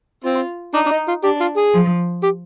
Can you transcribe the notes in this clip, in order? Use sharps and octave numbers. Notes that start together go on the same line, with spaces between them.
C4 F4
D4 D#4
D4
D#4
F4
D4 G4
F4
G#4
F3
G4